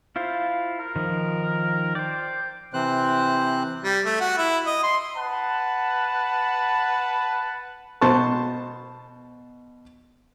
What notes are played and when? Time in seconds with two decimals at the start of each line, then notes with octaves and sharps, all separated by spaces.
0.16 E4 F4 C5 F5
0.79 A#4
0.96 D#3 F3
1.95 C5 D5 G5
2.74 C3 E3 C4 C5 F#6
3.84 G3
4.05 A3
4.20 F#4
4.38 E4
4.67 D#5
4.83 C6
5.17 B4 F#5 A5
8.01 B2 C5 A5 C6 C#6